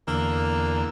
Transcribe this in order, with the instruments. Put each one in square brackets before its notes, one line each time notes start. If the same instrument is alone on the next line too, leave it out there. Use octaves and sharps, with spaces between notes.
[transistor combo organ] E2 D3 E6 [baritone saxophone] A#3